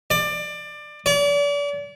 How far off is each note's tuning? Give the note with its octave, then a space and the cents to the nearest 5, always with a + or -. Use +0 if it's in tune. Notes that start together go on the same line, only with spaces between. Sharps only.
D5 +20
D5 -40